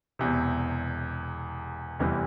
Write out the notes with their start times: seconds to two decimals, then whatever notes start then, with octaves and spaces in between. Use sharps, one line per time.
0.19 E1 E2 C3
1.99 F1 E2 C3 E3 G3